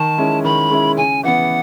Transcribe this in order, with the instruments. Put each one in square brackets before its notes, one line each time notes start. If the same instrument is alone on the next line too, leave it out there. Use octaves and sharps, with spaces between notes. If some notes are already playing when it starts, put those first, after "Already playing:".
Already playing: [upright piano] D#3 [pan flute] A5
[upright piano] G#3 C#4 E4
[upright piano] D#3 [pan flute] B5
[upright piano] G#3 C#4 E4
[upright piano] C#3 [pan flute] G#5
[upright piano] E3 B3 [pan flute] F#5